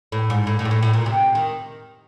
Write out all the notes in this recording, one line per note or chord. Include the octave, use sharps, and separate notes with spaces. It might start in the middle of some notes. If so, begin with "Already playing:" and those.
A2
G#2
A2
A2
G#2
A2
A2
A#2
C3
D#3